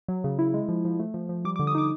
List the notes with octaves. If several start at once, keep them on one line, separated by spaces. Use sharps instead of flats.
F#3
C#3
E4
G#3
F3
F3
A3
F3
F3
G3 D6
D6
D3
D#6
D#4 D6